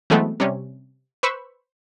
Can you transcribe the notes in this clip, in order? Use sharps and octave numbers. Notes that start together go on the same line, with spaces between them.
E3 F#3 G#3 A3 B3 C4
C3 G3 C#4
B4 C5 B5 C#6 E6